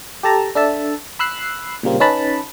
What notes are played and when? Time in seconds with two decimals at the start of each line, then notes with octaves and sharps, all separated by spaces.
0.23 G4 A4 A5 A#5
0.55 D4 A4 E5 A5
1.19 B5 E6 F#6 C7
1.83 A#2 C#3 G3 A#3 C4
2.00 C#4 D#4 B4 A5 B5